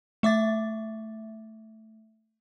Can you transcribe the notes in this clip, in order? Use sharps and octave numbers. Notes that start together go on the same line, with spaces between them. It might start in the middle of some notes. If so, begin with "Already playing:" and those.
A3 E5 D6 A6